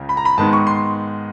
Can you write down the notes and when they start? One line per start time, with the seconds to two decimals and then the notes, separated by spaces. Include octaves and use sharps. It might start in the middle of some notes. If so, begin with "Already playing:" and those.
Already playing: C#2 C#3
0.09 B5
0.17 A#5
0.25 B5
0.38 G#2 D#3 G#3 B3 A5
0.53 C#6
0.67 C6